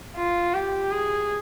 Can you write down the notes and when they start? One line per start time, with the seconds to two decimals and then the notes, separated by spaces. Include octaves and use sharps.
0.16 F4
0.54 G4
0.91 G#4